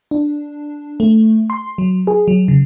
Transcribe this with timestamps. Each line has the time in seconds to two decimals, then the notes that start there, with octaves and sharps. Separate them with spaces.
0.11 D4
1.00 A3
1.50 C6
1.78 F#3
2.07 G#4
2.28 F#3
2.48 C#3